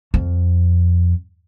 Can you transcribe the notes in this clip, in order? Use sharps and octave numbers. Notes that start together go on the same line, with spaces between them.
F2